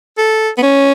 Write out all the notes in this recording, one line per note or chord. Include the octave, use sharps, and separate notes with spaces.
A4
B3
C#4